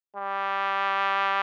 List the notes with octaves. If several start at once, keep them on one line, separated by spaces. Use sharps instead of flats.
G3